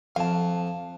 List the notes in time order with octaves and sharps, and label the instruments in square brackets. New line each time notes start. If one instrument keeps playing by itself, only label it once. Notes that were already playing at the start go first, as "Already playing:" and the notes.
[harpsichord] F2 [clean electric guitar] F5 A5